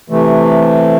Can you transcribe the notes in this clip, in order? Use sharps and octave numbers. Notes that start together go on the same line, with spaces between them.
C3 E3 A3